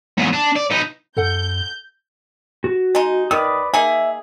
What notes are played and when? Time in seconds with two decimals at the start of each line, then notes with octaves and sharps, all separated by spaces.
0.17 E2 G#2
0.33 D4
0.56 D5
0.70 B3 D#4
1.17 F#2 A4 F#5 G6
2.64 F#4
2.95 G#3 D#4
3.31 D#3 B4 D5 D#6
3.74 A#3 D#4 G#4 E5